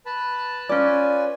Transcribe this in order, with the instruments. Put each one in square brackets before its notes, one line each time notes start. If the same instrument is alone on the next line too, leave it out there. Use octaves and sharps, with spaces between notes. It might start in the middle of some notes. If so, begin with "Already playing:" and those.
[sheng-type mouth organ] B4 A5 B5
[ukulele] C#4 D5 [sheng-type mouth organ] F4 B4 G#5